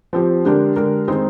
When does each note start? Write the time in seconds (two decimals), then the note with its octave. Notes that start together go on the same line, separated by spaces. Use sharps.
0.13 F3 C4 G4
0.45 D3 G#3 D4 G4 A#4
0.76 D3 G#3 D4 G4 A#4
1.07 D#3 G#3 C4 D#4 G#4